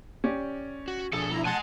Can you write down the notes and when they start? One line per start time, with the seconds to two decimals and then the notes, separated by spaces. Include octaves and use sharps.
0.24 C#4 G4 D5
0.88 F#4
1.13 B2 F3 D4 G#4 A4
1.31 E4 A#5
1.45 F#5 G#5 A5 C6